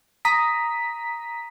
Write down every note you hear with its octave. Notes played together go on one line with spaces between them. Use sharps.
A#5 D#6 B6